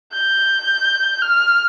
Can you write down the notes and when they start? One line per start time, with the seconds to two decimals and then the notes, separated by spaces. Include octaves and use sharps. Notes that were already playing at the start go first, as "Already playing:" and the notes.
0.12 G6
1.22 F6